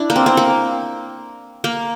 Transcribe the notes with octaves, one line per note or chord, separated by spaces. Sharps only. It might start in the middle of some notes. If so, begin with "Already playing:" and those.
Already playing: D4 E4
A#3
C4
C4
A#3
A#3